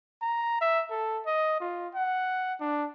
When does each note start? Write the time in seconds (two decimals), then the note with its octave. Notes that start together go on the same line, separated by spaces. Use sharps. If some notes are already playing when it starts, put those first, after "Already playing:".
0.21 A#5
0.61 E5
0.90 A4
1.26 D#5
1.60 F4
1.95 F#5
2.60 D4